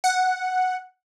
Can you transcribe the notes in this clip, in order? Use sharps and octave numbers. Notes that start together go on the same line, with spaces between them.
F#5